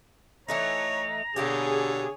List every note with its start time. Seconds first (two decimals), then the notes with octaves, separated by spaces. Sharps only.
0.48 E3 A3 D#4 C#5 A#5
1.36 B2 D3 A#3 G4 G#4 C#5